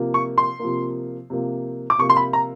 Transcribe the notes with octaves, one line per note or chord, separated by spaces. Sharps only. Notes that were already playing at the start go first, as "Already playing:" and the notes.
Already playing: C3 F3 A#3
C#6
C6
C3 F3 A#3
C3 F3 A#3
D6
C3 F3 A#3 C#6
C6
B5
A#5